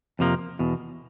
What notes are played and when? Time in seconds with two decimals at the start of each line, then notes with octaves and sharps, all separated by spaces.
0.19 F2 C3 F3 A#3
0.59 E2 B2